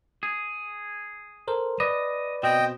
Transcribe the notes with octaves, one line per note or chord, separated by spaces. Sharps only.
G#4
A4 A#4 C5
B4 D5 D#5
B2 C4 D#5 G5